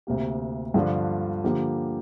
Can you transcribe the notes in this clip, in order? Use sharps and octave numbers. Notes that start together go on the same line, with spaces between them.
D2 C3 A#3 G4
G2 D3 F3 D4 F4
D3 F3 A#3 G4